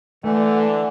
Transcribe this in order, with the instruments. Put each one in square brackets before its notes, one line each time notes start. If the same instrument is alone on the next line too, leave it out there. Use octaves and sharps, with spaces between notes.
[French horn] D3 [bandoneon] E3 [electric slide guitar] A3